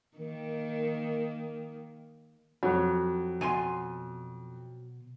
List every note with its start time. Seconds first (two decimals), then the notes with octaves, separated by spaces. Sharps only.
0.18 D#3 A#3
2.63 F2 F#3
3.41 B2 G#5 C6